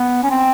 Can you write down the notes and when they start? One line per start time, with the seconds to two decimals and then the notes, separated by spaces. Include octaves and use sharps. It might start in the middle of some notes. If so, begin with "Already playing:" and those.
Already playing: B3
0.23 C#4
0.30 C4